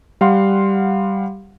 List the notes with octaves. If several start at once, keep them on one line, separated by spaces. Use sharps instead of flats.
G3 F5 F#5 C6